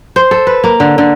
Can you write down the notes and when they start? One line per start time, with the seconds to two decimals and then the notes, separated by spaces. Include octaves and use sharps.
0.16 C5
0.31 A4
0.47 B4
0.64 A#3
0.80 D3
0.98 D3